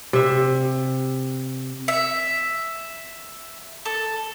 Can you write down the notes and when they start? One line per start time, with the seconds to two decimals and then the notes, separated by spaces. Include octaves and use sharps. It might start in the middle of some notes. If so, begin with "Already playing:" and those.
0.13 C3 E5
1.88 E5
3.86 A4